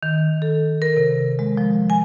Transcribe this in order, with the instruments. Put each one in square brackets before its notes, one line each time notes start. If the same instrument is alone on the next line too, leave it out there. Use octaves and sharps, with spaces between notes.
[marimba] D#3
A4
A#4
C3
G#3
F3
G#5